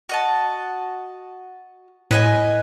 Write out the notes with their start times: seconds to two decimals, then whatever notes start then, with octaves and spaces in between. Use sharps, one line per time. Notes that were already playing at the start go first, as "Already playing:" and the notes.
0.09 F#4 D#5 A5
2.11 A2 B4 D#5 G#5